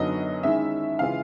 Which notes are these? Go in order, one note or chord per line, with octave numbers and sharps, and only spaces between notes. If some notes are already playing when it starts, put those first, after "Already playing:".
Already playing: F#2 D3 F#3 B3 D#4 D#5
D#3 G#3 C#4 E4 E5
C#3 E3 G#3 C#4 F4 F5